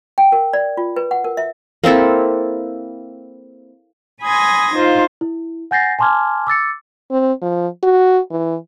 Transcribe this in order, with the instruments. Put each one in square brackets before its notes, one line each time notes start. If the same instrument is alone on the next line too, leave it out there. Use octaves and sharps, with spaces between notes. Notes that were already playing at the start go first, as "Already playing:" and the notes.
[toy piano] G5
A#4
D5
F4
B4
F#5
A#4
E5
[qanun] A#3 C4 E4 A4
[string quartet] G#5 B5 C6 D#6 G#6 A#6
D#4 F4 C5 F5
[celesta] E4
F#5 G#5 G6 A6 A#6 C7
G#5 A5 C6 D6 F6 G#6
D6 E6 A6 C#7
[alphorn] C4
F3
F#4
E3